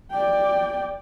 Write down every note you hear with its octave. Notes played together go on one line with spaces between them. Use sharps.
D5 G5